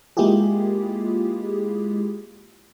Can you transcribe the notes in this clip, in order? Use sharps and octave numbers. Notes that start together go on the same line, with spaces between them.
G#3 A#3 E4 F4 G4 G#4